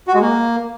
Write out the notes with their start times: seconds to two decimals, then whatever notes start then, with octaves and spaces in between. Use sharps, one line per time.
0.08 F#4
0.14 G#3
0.21 A#3